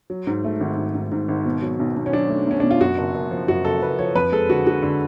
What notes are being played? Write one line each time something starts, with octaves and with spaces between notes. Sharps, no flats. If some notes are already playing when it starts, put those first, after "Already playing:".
F#3
G#2
A3
G#1
G#2
G#2
G#2
G#1
B2
F#3
B1
B1
C#4
F#3 D4
A3
B1 C#4
B2 D4
F4
F#2 F#4
F#1
F#1
F3
F#2 F#4
F#1 A4
F#1 B4
F3 C#5
F2 B4
G#3 A4
D3 F#4
D3 F#4
D3